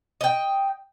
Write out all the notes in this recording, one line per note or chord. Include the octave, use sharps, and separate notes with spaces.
D#5 G5